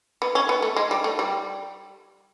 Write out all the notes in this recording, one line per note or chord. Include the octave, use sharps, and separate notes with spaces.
B3
C#4
B3
A3
G#3
G3
A3
G3